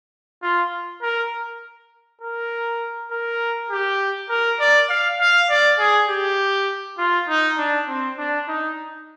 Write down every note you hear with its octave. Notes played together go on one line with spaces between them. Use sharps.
F4
A#4
A#4
A#4
G4
A#4
D5
F5
F5
D5
G#4
G4
F4
D#4
D4
C4
D4
D#4